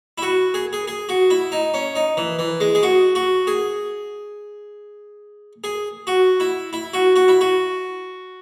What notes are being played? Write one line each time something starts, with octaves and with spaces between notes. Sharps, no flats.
E4
F#4
G#4
G#4
G#4
F#4
E4
D#4
C#4
D#4
E3
E3
G#3
G#4
F#4
F#4
G#4
G#4
F#4
E4
E4
F#4
F#4
E4
F#4